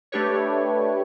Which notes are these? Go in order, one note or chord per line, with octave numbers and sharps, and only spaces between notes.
A3 D4 G4 B4 C#5